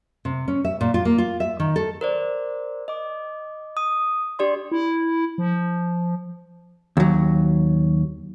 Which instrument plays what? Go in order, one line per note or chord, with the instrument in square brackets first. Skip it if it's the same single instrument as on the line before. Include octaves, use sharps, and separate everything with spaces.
[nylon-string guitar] C3
C#4
E5
A#2
F4
A#3
F4
E5
D#3
A4
[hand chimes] A#4 C5 D5
D#5 D6
D#6
D4 G4 D5 C6
[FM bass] E4
F3
[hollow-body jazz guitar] D#2 F#3